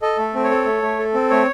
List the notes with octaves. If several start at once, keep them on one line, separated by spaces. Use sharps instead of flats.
A4 D#5
A3
C4
C#5
A4
A3
A3
A4
C4
A3 C#5